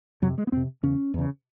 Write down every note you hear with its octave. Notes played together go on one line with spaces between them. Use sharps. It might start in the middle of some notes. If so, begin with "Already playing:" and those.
F2 C3 F#3
G#3
B3
F2 C3 C4
E2 C#3 C#4
E2 C#3